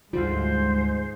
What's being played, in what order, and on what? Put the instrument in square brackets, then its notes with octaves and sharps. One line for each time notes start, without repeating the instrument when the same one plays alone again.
[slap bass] D2 D3 G3 [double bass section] G#2 G#3 [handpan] F4 [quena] C5